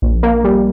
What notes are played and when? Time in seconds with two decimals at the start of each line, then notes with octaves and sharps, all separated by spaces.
0.02 A#1
0.23 A#3
0.44 G3